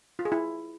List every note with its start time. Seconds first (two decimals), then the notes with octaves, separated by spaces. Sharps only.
0.19 F4
0.25 G#4
0.32 E4